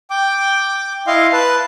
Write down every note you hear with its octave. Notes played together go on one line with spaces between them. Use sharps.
G5 D6
E4 D#5 F5 C6
B4 A5